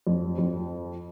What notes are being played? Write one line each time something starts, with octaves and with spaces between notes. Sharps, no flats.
F2
F2